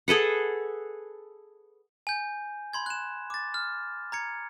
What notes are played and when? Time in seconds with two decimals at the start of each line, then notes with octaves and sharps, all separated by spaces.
0.08 G#4 A4 B4 F#5
2.07 G#5 G6
2.73 B5 C6 G#6
2.86 F#6 E7
3.30 D6 A6
3.54 F6
4.12 A#5 G#6 C#7